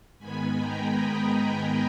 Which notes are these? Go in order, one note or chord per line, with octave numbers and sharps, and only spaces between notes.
G#2 D#3 G#3 B3 G#5 B5
G5 A#5
D#5 G5